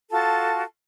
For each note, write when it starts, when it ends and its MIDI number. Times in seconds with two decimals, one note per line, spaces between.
0.11 0.62 65
0.11 0.62 66
0.11 0.62 69
0.11 0.62 81